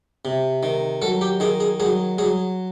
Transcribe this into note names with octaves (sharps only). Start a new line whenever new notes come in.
C3
D#3
F#3 A4
G4
D#3 G#4
G#4
F#3 G#4
F#3 G#4